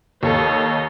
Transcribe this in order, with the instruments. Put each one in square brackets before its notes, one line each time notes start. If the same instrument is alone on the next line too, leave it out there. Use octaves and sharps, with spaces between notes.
[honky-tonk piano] D#2 A4 [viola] C#5 D#5